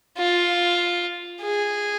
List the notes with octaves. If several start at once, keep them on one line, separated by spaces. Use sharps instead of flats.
F4
G#4